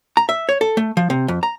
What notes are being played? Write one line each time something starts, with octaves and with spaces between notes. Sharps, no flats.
A#5
E5
C#5
A4
A3
F3
C3
F2
A#5